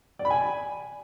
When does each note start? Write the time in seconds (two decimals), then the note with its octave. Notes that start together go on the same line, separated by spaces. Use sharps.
0.19 D5
0.25 B5
0.30 G#5